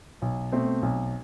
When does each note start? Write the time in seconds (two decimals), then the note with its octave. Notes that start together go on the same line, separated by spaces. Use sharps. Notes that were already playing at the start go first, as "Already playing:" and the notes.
0.22 B1
0.52 B2 A3 C4
0.82 B1